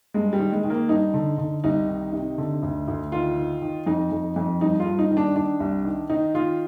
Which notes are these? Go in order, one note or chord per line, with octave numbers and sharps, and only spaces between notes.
G2 G#3
G3
D#3
G#3
D#3
A#3
G2 D#4
D3
D3
C2 D#4
D#3
C3
D3
D2
D2
D#3 F4
D#3
D#3
F2 D#4
F2
F2
G2 D#4
F4
G2
D#4
D#3
D4
D#3 D4
C2
D#3
D#3 D#4
D#3 F4